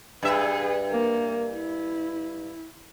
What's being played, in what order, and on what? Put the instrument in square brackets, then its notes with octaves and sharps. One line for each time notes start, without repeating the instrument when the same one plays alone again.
[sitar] G2 E5 [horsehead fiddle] G#4 B4
[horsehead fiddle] A#3
E4